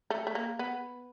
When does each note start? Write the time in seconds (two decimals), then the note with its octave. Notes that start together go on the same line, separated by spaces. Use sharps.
0.10 A3
0.27 A3
0.35 A#3
0.59 B3